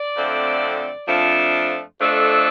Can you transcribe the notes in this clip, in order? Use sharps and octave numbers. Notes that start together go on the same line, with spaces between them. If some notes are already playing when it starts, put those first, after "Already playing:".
Already playing: D5
F2 D3 A3 C4
F2 F3 A3 D4
F2 F3 A3 D4 A4